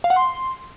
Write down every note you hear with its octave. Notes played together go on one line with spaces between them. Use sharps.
F5
F#5
C6